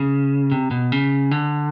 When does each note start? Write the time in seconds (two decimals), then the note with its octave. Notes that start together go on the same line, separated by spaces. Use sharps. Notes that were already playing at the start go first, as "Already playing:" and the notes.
Already playing: C#3
0.52 C3
0.71 B2
0.92 C#3
1.31 D3